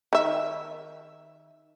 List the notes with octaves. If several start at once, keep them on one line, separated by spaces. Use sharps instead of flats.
D#3 E5